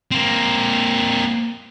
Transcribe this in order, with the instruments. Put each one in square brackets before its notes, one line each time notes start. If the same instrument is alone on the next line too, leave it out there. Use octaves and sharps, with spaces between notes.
[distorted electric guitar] A#3 C4